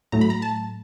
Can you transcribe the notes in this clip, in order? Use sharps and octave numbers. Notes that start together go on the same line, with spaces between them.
A2 F#3 A3 A#5
B5
A#5
A5